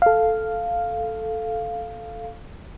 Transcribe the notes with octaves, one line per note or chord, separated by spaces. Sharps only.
A4 F5